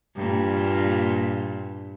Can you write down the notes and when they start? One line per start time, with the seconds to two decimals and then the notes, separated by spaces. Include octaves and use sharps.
0.16 G2 A#2